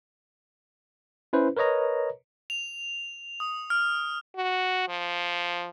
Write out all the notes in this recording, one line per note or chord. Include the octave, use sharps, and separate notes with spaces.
C#4 E4 B4 C5
A#4 B4 C#5 D#5 A#5
F7
D#6
F6
F#4
F3